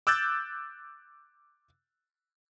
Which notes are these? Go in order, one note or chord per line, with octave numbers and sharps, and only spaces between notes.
D6 E6 F#6 G6 A6